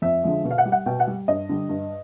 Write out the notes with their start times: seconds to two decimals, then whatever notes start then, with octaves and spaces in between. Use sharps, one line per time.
0.02 F2 E5
0.23 D3 F3 G#3
0.45 B2
0.51 F5
0.58 F#5
0.65 G3
0.72 F#5
0.86 B2 G5
1.00 F#5
1.07 G3
1.28 G2 D#5
1.49 D3 G3
1.69 G2